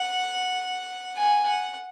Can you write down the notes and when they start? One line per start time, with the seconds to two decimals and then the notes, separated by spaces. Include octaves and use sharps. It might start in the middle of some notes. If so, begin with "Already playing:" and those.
Already playing: F#5
1.16 G#5
1.45 F#5